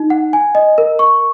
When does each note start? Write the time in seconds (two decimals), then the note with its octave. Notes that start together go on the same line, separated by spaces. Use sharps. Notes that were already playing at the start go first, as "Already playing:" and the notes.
Already playing: D#4
0.10 F#5
0.33 G#5
0.55 D#5
0.78 A#4
0.99 C#6